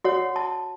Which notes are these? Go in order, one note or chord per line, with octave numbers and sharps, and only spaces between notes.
F#4 C#5 F#5
A5